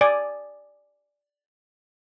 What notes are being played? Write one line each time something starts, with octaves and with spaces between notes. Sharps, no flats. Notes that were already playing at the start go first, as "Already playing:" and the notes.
D5 G#5